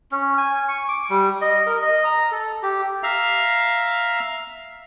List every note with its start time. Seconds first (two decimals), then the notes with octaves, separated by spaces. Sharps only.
0.12 C#4
0.38 G#5
0.68 C#6
0.88 D6
1.10 G3
1.41 D#5
1.67 A#4
1.82 D#5
2.05 A#5
2.32 A4
2.63 G4
3.03 E5 F5 A#5